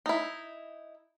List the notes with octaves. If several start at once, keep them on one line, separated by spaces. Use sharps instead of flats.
D#4 E4